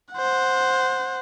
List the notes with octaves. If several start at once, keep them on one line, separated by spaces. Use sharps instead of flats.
C5 F#5